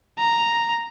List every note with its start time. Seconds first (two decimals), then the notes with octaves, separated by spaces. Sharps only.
0.19 A#5